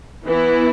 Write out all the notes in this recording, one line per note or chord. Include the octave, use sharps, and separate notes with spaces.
E3 B3 E4